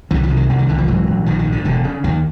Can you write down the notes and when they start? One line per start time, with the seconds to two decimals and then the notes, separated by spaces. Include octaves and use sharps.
0.11 C2 D3 E3
0.23 D#3 F3
0.30 C3
0.36 D#3
0.49 C2 D3
0.59 D#3
0.68 C2 D3 E3
0.78 D#3 F3
0.88 G#2 E3 F#3
1.07 A#1
1.26 A#1 D#3 F3
1.39 D#3
1.46 G#2
1.52 D3
1.65 E1 D3
1.84 C#3
2.04 D#2 D#3